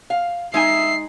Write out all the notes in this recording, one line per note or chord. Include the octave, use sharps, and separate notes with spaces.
F5
G#3 D#4 E5 G#5 C7